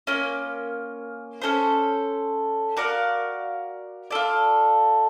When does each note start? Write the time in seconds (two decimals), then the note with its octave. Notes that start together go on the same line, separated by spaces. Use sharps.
0.07 A#3 C#4 F4
1.41 C#4 F#4 A4 C5
2.77 F#4 A#4 D5 F5
4.11 F4 A4 D5